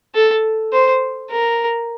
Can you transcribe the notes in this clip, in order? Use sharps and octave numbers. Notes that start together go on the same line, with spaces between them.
A4
C5
A#4